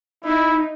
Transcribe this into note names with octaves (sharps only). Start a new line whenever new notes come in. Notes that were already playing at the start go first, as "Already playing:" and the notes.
D#4 E4